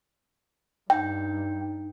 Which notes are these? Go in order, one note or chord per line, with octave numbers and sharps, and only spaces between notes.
G2 D#4 G5